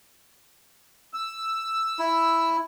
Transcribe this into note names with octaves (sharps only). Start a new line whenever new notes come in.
E6
E4